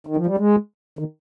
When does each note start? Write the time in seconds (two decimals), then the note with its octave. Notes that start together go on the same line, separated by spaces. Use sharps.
0.07 D#3
0.16 F3
0.26 G3
0.37 G#3
0.99 D#3